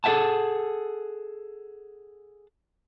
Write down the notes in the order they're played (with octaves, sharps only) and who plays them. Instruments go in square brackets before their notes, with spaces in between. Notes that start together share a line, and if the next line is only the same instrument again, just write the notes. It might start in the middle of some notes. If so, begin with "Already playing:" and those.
[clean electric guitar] G#4 A4 B4 E5 F#5 A5